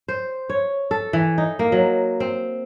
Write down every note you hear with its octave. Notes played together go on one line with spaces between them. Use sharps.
C5
C#5
A4
E3
D#4
A#3
F#3
C4